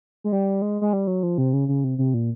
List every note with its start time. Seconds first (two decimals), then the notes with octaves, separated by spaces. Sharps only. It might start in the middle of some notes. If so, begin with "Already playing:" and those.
0.24 G#3
0.32 G3
0.62 G#3
0.81 G#3
0.93 G3
1.07 F#3
1.23 F3
1.38 C3
1.53 C#3
1.68 C#3
1.84 C3
1.98 C3
2.14 A#2